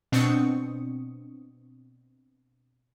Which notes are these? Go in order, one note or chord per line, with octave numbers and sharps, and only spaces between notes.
B2 C4 D4 C#6 D#6 C#7